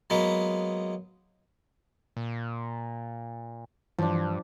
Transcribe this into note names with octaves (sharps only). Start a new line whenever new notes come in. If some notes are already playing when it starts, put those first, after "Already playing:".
F#3 G#3 A#3 B3
A#2
G2 E3 F3 D4